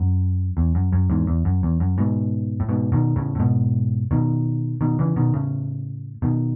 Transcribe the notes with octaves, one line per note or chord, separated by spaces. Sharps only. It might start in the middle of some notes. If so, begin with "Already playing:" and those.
Already playing: F#2
E2
F#2
F#2
E2 G#2
E2
F#2
E2
F#2
G#2 B2
A2
G#2 B2
B2 D#3
A2 C#3
A2
G#2 B2
B2 D#3
B2 D#3
C#3 E3
B2 D#3
A2 C#3
B2 D#3